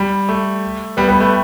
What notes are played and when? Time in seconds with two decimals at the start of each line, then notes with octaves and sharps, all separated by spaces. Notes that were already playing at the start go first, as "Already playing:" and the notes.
Already playing: G3
0.29 A3
0.97 G3 B3
1.08 G3 B3
1.20 A3